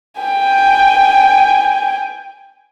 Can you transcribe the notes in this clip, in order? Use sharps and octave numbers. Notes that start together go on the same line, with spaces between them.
G5 G#5